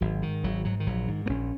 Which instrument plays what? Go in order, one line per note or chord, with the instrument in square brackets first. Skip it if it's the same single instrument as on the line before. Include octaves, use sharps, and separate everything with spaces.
[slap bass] G#1 F#3
G#2 D#3
G#1 F#3
G#2 F#3
D#3
A#1 F#3
G#2 D#3
A#3
A#1 C#4